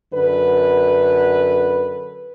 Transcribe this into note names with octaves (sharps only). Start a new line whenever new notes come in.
F#2 D3 B4